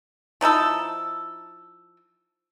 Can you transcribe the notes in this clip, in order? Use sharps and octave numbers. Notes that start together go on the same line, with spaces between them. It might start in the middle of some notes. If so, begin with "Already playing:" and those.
F3 D#4 E4 A4